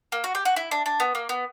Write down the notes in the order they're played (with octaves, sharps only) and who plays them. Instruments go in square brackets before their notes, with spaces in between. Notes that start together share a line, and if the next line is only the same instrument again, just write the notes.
[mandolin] A#3
F#4
G4
F#4
E4
D4
D4
B3
A#3
B3